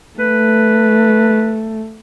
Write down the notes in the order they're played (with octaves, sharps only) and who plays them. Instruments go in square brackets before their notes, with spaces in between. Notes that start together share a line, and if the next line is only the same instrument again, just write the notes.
[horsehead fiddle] A3 [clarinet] B4